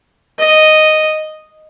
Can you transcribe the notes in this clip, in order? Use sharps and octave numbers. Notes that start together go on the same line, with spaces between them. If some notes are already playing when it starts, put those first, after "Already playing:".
D#5